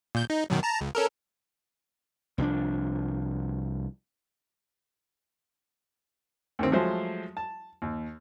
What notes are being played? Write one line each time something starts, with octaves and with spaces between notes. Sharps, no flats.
A#2 G6
D#4
F#2 B2 D#3
A5 A#5
C#2
C#4 A4 A#4
C2 F3 F#3 D4
D2 D#3 C4
F3 F#3 G#3 A3 C5
A5
D#2